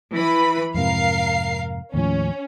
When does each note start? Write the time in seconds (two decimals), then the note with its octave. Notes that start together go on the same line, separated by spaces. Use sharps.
0.14 E3 B4 B5
0.74 F2 G#2 C3 A#4 F5 C7
1.94 D#2 A2 F3 C#4